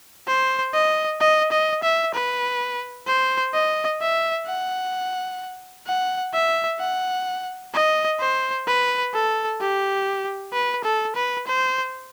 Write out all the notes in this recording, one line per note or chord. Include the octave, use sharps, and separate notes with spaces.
C5
D#5
D#5
D#5
E5
B4
C5
D#5
E5
F#5
F#5
E5
F#5
D#5
C5
B4
A4
G4
B4
A4
B4
C5